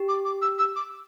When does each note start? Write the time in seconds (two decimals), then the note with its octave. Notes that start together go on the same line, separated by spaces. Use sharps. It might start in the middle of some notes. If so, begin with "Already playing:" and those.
Already playing: G4
0.08 D6
0.25 D6
0.42 E6
0.59 E6
0.76 D6